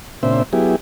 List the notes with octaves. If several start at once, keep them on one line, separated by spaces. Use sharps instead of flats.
A#2 C#3 C4 D4 C5 E5
F#3 B3 E4 G4 G#4